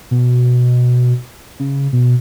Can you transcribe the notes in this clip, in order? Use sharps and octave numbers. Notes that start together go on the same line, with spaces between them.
B2
C#3
B2